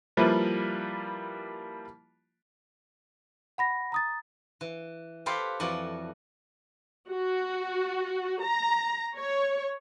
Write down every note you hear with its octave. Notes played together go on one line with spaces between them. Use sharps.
F3 G3 A#3 E4 F4 B4
F#5 B5 A#6
A#5 D#6 A6
E3
G4 A4 B4 C5 F5 G5
F2 E3 F#4 C#5 D5
F#4
A#5
C#5